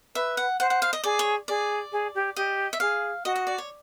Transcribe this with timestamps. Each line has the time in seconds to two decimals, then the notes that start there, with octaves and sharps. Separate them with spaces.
0.15 B4 E5
0.37 F#5
0.60 C5 F#5
0.70 F#5
0.82 F5
0.93 D#5
1.04 G#4 D5
1.19 C#5
1.48 G#4 D5
1.92 G#4
2.14 G4
2.36 G4 D#5
2.73 E5
2.80 G#4 F5
3.25 F#4 D#5
3.36 D#5
3.47 D5
3.58 C#5